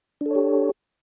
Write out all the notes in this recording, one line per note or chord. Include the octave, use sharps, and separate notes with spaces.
D4 G4 A4 C#5